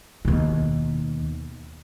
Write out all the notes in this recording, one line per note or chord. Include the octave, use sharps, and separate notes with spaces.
D#2 B2